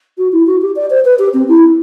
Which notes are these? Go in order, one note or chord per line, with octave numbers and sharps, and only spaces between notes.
F#4
E4
F#4
G4
D5
C5
B4
G4
C4
E4